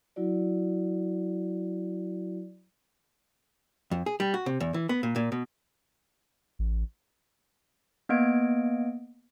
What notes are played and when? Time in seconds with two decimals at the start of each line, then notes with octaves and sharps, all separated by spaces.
0.16 F#3 E4 F#4 D5
3.91 F2
4.06 G#4
4.20 G3
4.34 F#4
4.46 C3
4.60 E2
4.74 E3
4.89 B3
5.03 A#2
5.16 A#2
5.32 B2
6.59 A1
8.09 A#3 B3 D#5 G#6 D7